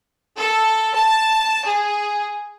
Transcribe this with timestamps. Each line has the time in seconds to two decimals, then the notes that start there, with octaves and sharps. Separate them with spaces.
0.37 A4
0.95 A5
1.65 G#4